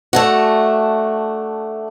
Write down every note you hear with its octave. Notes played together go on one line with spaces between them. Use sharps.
A3 D4 F#4